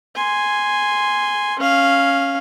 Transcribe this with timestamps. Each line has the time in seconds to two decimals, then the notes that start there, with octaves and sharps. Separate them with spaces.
0.15 G#5 C6
1.59 C#4 F5